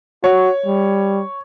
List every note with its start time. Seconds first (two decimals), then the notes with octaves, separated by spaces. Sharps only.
0.24 F#4 C#5
0.66 G3